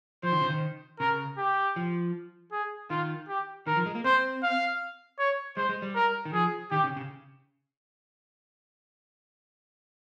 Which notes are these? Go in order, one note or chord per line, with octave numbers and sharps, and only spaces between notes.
F3 C5
D#3
C#3
D#3
C#3 A#4
G4
F3
G#4
D#3 F4
G4
D#3 A#4
F3
G#3
A#3
C4 C5
F5
C#5
G#3 C5
G#3
G3
A#4
D#3
F3 G#4
D#3 G4
C#3
C#3